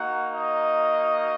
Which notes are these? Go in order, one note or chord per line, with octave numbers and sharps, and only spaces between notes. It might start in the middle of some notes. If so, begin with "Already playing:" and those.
Already playing: A#3 D#4 F#4 F#5
D#5